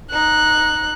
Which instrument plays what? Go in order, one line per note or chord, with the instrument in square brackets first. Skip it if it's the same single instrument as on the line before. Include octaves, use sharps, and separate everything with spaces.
[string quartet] D#4 [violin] F#6